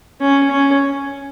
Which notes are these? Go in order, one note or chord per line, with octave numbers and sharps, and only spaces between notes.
C#4
C#4